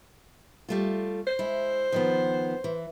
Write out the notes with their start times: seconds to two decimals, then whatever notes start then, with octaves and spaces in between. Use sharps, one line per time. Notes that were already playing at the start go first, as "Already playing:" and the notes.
0.69 G3 A3 F4
1.27 C5
1.39 G#3 E4
1.92 D#3 F3 B3
2.64 E3